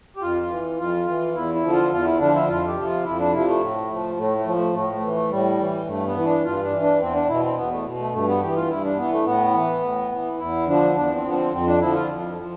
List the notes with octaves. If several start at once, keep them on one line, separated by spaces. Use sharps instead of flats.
G4
F2 F4
F4
E3
F2 F4
E3
E2 E4
E4
D3 F3
F4
E2 F4
E4
D3 F3 D4
E4
F2 F4
G4
C3 F3
F4
F2 E4
D4
C3 F3 E4
A3
A2
F3
A2 A3
A3
F3
A3
A2 A3
A3
E3
A3
A2 G3
E3
G2 A3
B3
E3 E4
D4
G2 F4
D4
E3
D4
E2 C4
D4
B2 E4
C4
E2 B3
A3
B2
A3
G2 A3
B3
E3 G4
F4
G2 E4
D4
E3 B3
A3
A2 B3
E3
A2
E3
E2 E4
D3 F3 D4
E2 D4
C4
D3 F3 B3
C4
F2 C4
D4
D3 F3 E4
F4
F2
F3